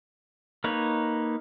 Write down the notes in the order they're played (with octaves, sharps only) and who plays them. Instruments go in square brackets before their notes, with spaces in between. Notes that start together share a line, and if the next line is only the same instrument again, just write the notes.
[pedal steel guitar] A#3 D#4 B4 C#5